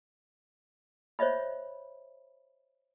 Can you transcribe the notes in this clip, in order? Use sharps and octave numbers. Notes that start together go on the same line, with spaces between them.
C5 C#5 D#5 E5 B5